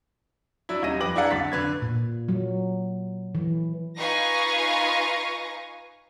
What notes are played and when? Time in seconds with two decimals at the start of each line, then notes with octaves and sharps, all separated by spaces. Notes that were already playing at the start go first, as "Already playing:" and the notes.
0.69 F#3 D4 E4
0.82 D#1 C#4 D#4 E6 A#6 D#7
1.00 F2 B4 G5 D6 A#6 F#7
1.16 D4 E4 G#4 F5 F#5 A#5
1.31 B1 D3 A6 B6
1.52 D3 B4 G#6
1.82 A#2
2.29 F#3
3.35 E3
3.97 D#4 F4 B4 G#5 C#6 A#6